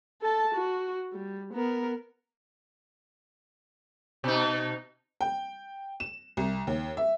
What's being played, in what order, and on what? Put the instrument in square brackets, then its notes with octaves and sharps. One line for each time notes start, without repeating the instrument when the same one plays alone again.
[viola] A4 A5
F#4
G3
B3 A#4
[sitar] B2 D#4
[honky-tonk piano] G5
E7
C2
D#2
E5